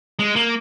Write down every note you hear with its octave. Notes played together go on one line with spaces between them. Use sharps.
G#3
A#3